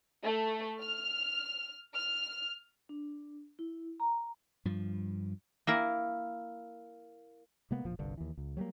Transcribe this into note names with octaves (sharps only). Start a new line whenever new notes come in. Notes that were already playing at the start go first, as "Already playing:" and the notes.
A3
F6
F6
D4
E4
A#5
G2 F3
A#3 E4 A#4
C3 G#3 A#3 B3
E1 A#2 F3
G1 C2 G2 D3
D#2 E3
C#2
F#3 G3 A3 A#3